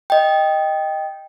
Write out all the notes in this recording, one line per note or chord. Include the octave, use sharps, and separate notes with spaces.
D#5 G5